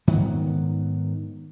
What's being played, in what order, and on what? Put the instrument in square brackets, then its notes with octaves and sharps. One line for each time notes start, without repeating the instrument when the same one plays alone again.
[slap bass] G#2 D#3 F#3 B3